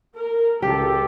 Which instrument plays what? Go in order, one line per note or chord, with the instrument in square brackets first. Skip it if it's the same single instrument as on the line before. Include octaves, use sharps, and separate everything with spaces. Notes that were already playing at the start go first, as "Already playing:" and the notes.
[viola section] A#4
[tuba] C#2 [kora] G4 [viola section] A4